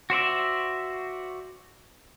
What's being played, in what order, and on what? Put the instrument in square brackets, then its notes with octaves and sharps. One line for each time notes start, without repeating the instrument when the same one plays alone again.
[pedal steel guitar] F#4 C5 D5 E5